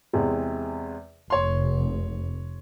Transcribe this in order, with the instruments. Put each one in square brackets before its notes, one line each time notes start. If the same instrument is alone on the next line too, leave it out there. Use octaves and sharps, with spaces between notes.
[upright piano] E2 C3 G#3
[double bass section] F1 [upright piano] C#5 C6